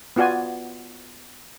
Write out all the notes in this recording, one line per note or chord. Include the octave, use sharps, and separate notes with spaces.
B3 F4 F#4 D5 G#5